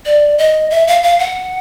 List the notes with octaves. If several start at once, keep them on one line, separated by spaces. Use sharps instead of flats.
D5
D#5
E5
F5
F5
F#5